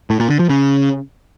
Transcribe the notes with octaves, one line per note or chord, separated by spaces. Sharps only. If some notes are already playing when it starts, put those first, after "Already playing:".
A2
A#2
D3
F3
C#3